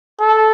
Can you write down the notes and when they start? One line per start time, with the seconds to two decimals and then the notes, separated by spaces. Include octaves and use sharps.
0.20 A4